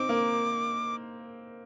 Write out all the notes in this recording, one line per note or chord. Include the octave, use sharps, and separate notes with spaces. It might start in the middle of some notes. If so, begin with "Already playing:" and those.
Already playing: C4 D#4 D6
A#3